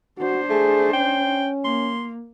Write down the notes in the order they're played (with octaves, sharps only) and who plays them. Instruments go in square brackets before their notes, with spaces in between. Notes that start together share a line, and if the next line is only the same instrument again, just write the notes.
[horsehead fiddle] D4 C5 [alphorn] F#4
[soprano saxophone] A3 [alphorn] G#4
[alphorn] C#4 [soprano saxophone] G5
[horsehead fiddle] A#3 [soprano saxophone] C6